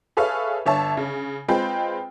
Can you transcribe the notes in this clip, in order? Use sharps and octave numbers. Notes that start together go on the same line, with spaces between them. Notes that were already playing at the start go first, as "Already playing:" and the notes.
G#4 A4 B4 C#5 E5 F5
G1 C#5 E5 A5
C#3
G#3 C4 F4 B4 G5 B5